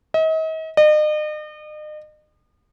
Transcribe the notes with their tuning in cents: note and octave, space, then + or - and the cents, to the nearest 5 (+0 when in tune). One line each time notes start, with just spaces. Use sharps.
D#5 +40
D#5 -40